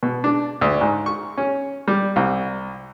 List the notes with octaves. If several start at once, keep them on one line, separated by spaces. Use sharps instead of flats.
B2
D4
D2
G#2
C#6
C#4
G3
C2